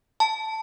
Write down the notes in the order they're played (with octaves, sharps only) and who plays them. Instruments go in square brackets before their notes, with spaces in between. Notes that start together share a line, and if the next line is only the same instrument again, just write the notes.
[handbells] A5